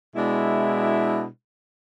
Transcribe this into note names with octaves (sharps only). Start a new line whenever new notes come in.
B2 G#3 D4 E4